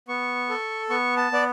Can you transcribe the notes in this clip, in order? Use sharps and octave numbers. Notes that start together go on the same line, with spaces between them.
B3 C#6
A4
B3 C#6
A5
B3 D5